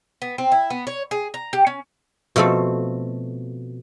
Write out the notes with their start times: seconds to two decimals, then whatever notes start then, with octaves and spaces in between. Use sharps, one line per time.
0.22 B3
0.38 C4
0.52 E4
0.70 B3
0.87 C#5
1.11 G#4
1.34 A#5
1.53 G4
1.67 C#4
2.36 B2 F3 A3 C4 A4